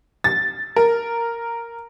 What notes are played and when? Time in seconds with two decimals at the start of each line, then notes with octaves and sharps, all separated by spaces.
0.24 A6
0.76 A#4